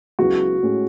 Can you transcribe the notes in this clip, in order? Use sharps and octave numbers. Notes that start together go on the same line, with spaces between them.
C#2 C#3 F#3 B3 E4 F#4
A2 G#3 C#4